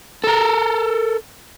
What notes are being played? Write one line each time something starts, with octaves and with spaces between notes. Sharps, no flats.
A4 A#4